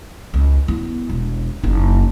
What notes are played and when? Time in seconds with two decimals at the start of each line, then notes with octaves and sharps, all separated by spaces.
0.34 C#2
0.68 B3 E4
1.09 E1
1.64 F#1 D#4